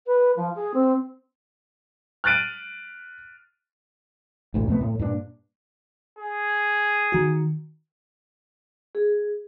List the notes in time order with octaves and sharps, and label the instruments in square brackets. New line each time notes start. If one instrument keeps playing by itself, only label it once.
[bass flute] B4
F3
G#4
C4
[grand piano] F6 F#6 A6 D7 D#7
[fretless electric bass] A1 D2 A2
F2 C3 A3 B3
A2
G2 A#2 D4
[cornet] G#4
[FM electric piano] D#3 F#4
[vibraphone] G#4